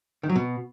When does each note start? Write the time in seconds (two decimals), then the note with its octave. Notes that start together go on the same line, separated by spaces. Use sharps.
0.23 D#3
0.29 F#3
0.36 B2